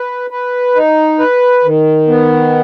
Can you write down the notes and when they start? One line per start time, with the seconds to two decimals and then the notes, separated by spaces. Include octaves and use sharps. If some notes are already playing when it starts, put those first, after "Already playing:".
Already playing: B4
0.30 B4
0.75 D#4
1.19 B4
1.64 D#3
2.08 B3